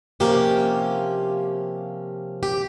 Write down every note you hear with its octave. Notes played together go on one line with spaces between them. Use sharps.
C3 F3 A#3 C#4 G4
G4